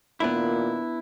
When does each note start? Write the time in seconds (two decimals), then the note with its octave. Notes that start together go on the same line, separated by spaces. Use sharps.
0.20 A#2 D#3 B3 D4 E4